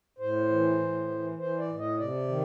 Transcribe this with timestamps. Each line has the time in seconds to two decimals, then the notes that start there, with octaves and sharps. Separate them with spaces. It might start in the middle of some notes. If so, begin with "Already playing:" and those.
0.19 A2 C5
0.49 E3
0.79 A2
1.09 E3
1.38 E3 C5
1.58 D5
1.68 A2
1.78 D#5
1.98 C3 D5
2.28 D#3